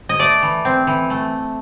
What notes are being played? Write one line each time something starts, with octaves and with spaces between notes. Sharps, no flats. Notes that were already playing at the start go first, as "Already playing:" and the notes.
D#5
A3 D5
E3
C4
E3
A3